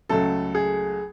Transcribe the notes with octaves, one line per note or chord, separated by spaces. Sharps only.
C#2 C#3 F#3 A3 A4
G#4